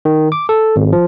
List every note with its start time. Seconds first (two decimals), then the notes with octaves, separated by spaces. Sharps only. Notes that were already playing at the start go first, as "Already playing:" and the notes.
0.05 D#3
0.32 D6
0.49 A4
0.76 G#1
0.93 F3